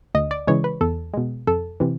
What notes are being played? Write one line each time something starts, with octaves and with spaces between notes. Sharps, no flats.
D2 D#5
D5
C#3 E3 G#3 C#5
B4
E2 A4
B2 G#3
F2 A4
C3 E3